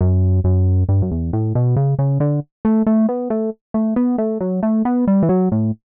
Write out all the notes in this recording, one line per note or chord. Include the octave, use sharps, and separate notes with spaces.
F#2
F#2
G2
F#2
E2
A2
B2
C#3
C#3
D3
A3
A3
B3
A3
A3
B3
A3
F#3
A3
B3
G3
E3
F#3
A2